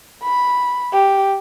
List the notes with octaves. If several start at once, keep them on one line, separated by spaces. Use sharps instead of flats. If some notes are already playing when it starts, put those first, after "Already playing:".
B5
G4